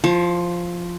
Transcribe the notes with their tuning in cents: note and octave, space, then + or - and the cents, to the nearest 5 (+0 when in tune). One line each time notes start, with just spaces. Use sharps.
F3 +0 C5 +45